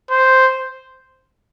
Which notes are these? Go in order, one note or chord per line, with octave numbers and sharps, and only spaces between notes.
C5